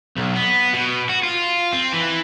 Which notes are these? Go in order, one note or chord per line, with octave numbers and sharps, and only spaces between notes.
B1
B3
B2
F#4
F4
C4
E3